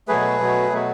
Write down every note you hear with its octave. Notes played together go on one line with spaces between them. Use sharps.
B2 F#3 A3 G#4 B4
B2 F#3 A3
B2 F#3 A3